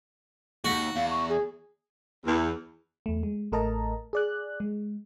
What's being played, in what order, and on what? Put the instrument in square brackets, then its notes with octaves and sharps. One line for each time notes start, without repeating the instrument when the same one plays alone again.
[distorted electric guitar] D#2 [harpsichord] F#4
[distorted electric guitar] E2 [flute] F5
[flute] C#6
G#4
[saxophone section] E2
[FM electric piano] E2 A3
G#3
A1 A3 A#4 D#5 A5 A#5
G#4 D5 F#6
G#3